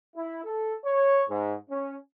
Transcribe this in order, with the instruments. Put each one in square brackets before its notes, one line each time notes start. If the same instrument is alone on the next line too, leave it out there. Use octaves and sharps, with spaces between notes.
[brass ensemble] E4
A4
C#5
G#2
C#4